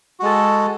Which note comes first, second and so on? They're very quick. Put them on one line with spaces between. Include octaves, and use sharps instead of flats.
F#4 G#3 A4